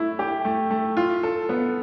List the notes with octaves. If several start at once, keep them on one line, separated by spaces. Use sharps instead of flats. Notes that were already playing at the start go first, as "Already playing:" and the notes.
Already playing: A3 E4
G4
A3
A3
F4
A4
B3